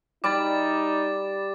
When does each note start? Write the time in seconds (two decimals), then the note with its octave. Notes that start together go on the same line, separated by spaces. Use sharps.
0.24 G3 D#4 D5 D6 A6